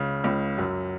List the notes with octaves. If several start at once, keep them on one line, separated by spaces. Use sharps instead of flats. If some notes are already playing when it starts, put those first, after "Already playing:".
Already playing: C#2 C#3
C#2 C#3
F#2 F#3